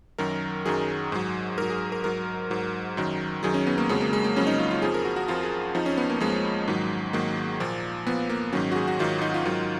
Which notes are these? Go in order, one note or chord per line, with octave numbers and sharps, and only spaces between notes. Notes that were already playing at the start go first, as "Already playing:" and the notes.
F#2 D#3 F#3 A#4
F#2 D#3 F#3 G#4
G#2 F#3
G#2 F#3 A#4
G#4
A#4
G#2 F#3 A#4
G#2 F#3
F#2 D#3 F#3
F#2 D#3 F#3 G#4
C#4
B3
A#3
F2 C#3 F#3 G#3
A#3
G#3
A#3
F2 C#3 F#3 C#4
D#4
F4
F4
F2 F3 G#4
A#4
F#4
F#4
F2 F3 F4
G#4
F2 F3 D#4
C#4
B3
A#3
F2 F3 G#3
G#2 D#3 F#3
G#2 D#3 F#3 A#3
A#2 F3
A#2 F3 B3
A#3
G#2 D#3 F#3 C#4
F#4
G#4
F#4
G#2 D#3 F#3 F4
D#4
F4
G#2 D#3 F#3